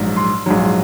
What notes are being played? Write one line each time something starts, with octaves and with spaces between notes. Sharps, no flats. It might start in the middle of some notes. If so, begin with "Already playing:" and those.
Already playing: A#1 G#2 F#3
C6
A#1 G#2 F#3